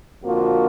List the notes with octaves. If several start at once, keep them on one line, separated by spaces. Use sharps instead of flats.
F2 D3 F3 A#3 F#4